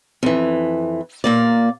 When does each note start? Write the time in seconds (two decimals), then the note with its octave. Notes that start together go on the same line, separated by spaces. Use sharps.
0.23 F2 E3
1.24 A#2 A#3 D5